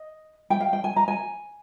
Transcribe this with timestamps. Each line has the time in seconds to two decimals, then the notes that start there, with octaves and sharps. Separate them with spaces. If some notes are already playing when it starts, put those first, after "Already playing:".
Already playing: D#5
0.50 G5
0.60 F5
0.73 G5
0.84 G#5
0.96 A#5
1.08 G#5